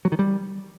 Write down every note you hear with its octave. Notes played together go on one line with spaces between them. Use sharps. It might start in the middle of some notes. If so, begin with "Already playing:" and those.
F#3
D#3
G3